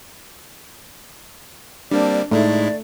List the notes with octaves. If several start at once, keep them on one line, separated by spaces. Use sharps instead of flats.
G3 A#3 C4 D4 D5
A2 G#3 A3 D#4 E4 D5